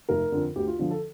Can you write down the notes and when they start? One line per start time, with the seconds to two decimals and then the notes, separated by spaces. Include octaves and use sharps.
0.09 F1 A#4
0.32 F2 D3
0.56 D2 G4
0.67 F4
0.79 D3 F3
0.91 A4